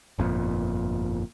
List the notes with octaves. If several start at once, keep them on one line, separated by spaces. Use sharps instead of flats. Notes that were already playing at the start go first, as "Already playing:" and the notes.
G1 F2 A#2